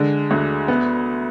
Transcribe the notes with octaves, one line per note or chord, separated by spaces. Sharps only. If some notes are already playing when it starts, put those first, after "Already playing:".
Already playing: D3 G#3
D2
B3